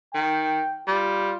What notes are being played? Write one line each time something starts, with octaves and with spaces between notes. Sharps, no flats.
D#3 G5
G3 F4